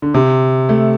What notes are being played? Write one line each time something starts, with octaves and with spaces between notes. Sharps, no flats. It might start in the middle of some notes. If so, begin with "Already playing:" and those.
D3
C3
A3